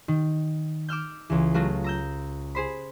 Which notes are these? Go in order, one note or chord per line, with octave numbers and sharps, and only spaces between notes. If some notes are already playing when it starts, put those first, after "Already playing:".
D#3
D6 E6 F6 G6
C#2 E3
F#3 A3 F4 F#4 A#4
A#5 E6 G6
G#4 C5 B5